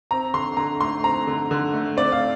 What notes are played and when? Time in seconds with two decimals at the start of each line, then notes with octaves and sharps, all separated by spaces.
0.11 C4 A#5
0.34 D3 C6
0.57 D3 A#5
0.81 A3 C6
1.04 C4 A#5
1.27 D3
1.51 D3
1.74 A3
1.97 C4 D5
2.12 F5